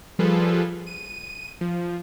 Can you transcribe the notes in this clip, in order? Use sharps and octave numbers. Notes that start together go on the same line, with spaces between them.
F3 G3 F4 G#4 A4 B4
D#7
F3